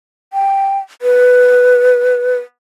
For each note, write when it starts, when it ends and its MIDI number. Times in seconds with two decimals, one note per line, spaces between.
0.33 0.78 79
1.02 2.37 71